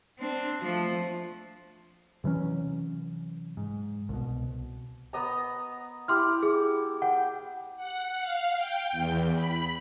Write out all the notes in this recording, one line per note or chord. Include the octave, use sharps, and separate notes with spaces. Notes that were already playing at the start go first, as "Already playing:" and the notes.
C4 D4
F3 A3
C3 E3 F#3 C#4
G#2
C2 B2
B3 D#5 A#5
E4 G4 C6 F6
G#4
F#5 G5
F#5
F5
G5
E2
B5